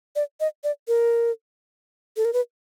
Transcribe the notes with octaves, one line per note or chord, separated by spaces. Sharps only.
D5
D#5
D5
A#4
A4
A#4
B4